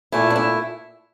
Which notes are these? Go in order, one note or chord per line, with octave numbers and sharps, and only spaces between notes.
A#2 A3 E4
D4
E4